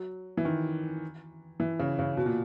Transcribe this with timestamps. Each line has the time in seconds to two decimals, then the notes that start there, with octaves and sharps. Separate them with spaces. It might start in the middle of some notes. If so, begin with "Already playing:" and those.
Already playing: F#3
0.37 E3
0.45 D#3
1.60 E3
1.79 C#3
1.99 C#3
2.17 B2
2.26 A#2